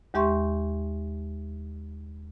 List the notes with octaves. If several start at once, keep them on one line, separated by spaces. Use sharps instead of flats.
D#2 G#3 G4 E5 C6 C#6